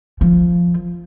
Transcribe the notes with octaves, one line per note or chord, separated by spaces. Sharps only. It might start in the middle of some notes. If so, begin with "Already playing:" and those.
F3